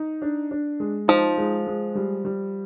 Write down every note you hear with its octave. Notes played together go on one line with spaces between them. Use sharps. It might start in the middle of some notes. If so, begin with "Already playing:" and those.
Already playing: D#4
D4
D4
G#3
F3 D#4
G#3
G#3
G3
G3